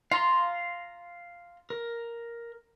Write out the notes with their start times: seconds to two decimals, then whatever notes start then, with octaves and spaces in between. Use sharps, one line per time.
0.11 F4 F5 A#5 C6
1.70 A#4